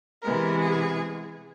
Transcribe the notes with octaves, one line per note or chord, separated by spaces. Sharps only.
C3 E3 G#3 B3 A#4
G#4